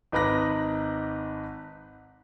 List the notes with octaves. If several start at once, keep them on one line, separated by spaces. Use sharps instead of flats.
G#1 D#4 B4 D6 F#6 A#6